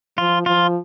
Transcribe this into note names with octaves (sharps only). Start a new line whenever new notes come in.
F3 F4
F3 F4